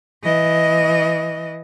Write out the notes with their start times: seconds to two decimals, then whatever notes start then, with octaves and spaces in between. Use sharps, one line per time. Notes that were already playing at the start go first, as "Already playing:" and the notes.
0.23 E3 D#5